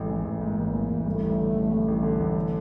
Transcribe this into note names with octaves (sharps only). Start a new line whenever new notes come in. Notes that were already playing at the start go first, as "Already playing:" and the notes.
Already playing: A1 G#2 A3
E3
A1
G#2 A#3
A1
E3
A1
G2 A3
A1
D3
A1
G2
A1
D3
A1
D3